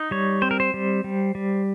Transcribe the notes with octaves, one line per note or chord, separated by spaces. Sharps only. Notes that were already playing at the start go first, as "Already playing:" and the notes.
Already playing: D#4
G3 C#5
C4 C5
A#4
C5
G3
G3
G3